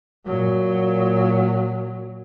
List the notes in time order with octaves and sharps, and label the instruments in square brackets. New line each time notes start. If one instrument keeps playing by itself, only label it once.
[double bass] A#2 F#3